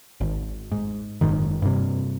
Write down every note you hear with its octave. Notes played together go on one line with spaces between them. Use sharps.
G#1
G#2
F#1 G#2 D#3
G2 C3